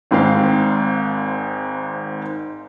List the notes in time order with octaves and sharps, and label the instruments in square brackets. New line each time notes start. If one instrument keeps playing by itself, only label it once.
[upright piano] G#1 G#2 C4 F5